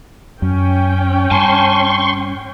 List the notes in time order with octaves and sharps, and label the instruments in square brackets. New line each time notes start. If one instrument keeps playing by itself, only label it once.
[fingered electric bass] F#2 [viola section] C#4 G5
[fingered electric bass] G2 [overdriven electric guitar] G#5 A5 [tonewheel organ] C6 C#6